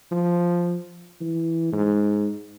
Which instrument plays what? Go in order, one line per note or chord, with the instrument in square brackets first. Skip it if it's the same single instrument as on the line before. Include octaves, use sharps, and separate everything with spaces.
[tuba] F3
E3
G#2